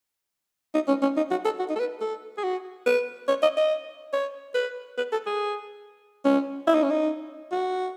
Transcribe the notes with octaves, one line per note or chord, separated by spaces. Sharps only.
D#4
C#4
C#4
D#4
F#4
A4
F#4
D#4
A4
B4
A4
G#4
F#4
B4
C#5
D#5
D#5
C#5
B4
B4
A4
G#4
C#4
E4
D#4
C#4
D#4
F#4